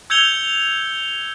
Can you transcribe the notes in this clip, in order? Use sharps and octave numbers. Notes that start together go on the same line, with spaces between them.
E6 G6 G#6 C#7 F7 G7